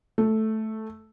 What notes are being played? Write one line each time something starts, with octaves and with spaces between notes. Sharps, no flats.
A3